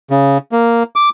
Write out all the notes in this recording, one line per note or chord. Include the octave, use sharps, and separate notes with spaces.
C#3
A#3
D6